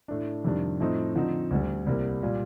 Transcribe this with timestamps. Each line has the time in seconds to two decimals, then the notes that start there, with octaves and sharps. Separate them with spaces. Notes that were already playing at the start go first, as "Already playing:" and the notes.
0.08 A2 A3 D4
0.44 F2 C3 D#3 G3 D4
0.80 A2 F3 A3 C4 D#4
1.15 D3 F3 C4 D#4
1.51 D2 D3 G3
1.86 C2 C3 G3 A#3
2.23 A#2 G3